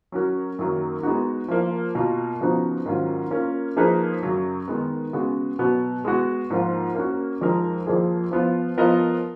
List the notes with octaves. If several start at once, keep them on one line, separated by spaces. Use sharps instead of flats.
F#3 C#4 F#4 A#4
F#2 D#3 F#3 A#3
G#3 B3 D#4 F#4
F3 A#3 F4
B2 A#3 F4 A#4
C#3 F3 B3 D#4 F#4
G#2 D#3 F#3 C#4 F4
A#3 C#4 F4 A#4
F3 A#3 D#4 G#4 B4
F#2 C#3 F#3
D#3 G#3 B3
C#3 G#3 B3 F#4
B2 F#3 B3 F#4
G#3 B3 F#4
G#2 F3 A#3 F4
A#3 C#4 F#4
F2 F3 G#3 D#4 A#4
F2 F3 A#3 F4 G#4
F3 B3 F4
F3 B3 F4 A#4 D#5